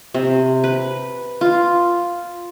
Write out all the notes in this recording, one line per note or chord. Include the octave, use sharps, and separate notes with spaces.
C3
B4
F4